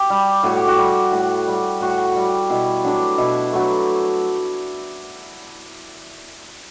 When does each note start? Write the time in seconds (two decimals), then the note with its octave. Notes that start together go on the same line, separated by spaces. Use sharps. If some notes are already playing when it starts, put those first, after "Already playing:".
Already playing: G4
0.10 G3
0.43 A2 F#4
0.57 G4
0.68 F#4
0.78 G3
1.12 A2
1.47 G3
1.80 A2 F#4
2.16 G3
2.50 B2 E4
2.85 F#3 A3 D4
3.18 B2 E4
3.52 F#3 A3